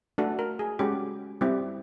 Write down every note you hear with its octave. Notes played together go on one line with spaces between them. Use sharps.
A3 D4 F#4 A4
A#4
G#4
G#3 C#4 F#4 G4
G3 C4 E4 G4